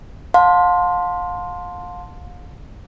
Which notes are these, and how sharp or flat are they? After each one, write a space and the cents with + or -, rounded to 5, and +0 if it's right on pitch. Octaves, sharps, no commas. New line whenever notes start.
F5 +35 A5 +10 C6 +0